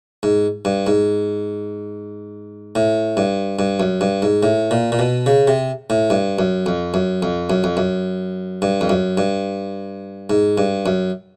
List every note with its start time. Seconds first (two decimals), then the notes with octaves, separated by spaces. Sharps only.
0.23 G#2
0.65 G2
0.87 G#2
2.75 A2
3.17 G2
3.59 G2
3.80 F#2
4.01 G2
4.22 G#2
4.43 A2
4.71 A#2
4.92 A#2
4.99 B2
5.26 C#3
5.47 C3
5.90 A2
6.10 G2
6.39 F#2
6.66 F2
6.94 F#2
7.23 F2
7.50 F#2
7.64 F2
7.77 F#2
8.62 G2
8.81 F2
8.89 F#2
9.17 G2
10.30 G#2
10.58 G2
10.86 F#2